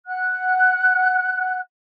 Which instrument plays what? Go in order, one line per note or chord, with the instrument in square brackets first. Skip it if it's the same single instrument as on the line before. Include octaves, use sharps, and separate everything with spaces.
[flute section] F#5 F#6